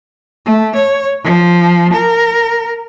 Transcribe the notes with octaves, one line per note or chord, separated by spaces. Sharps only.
A3
C#5
F3
A#4